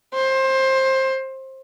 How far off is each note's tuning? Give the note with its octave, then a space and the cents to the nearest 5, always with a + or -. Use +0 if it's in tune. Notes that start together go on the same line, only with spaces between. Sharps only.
C5 +20